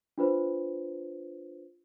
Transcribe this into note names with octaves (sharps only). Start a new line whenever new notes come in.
D4 F4 B4 C5